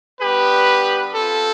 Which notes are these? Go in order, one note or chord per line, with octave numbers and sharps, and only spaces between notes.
G3 B3 D4 G4 B4
C4 F4 A4